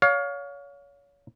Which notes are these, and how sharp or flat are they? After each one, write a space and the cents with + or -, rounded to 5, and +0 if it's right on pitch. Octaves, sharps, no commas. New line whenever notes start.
C#5 +30 F5 +25